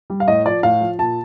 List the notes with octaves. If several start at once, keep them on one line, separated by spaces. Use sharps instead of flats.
G3
F5
A2 D#5
F3 D5
A2 F5
F3
A#2 A5